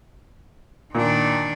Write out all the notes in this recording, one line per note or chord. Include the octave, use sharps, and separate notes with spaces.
A#2 D#3 D4